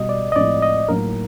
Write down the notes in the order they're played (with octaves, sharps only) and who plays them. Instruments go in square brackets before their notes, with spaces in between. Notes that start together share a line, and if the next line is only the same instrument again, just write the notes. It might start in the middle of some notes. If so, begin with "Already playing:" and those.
Already playing: [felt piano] B2 G3 [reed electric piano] D#5
[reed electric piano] D5
D#5
[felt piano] A2 F3 G#3 C4 E4 [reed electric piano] D5
[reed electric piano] D#5
[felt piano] A2 F#3 A#3 D#4 [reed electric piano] A#4